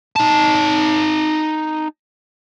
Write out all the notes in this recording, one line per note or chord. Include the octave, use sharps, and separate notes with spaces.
D#4 A5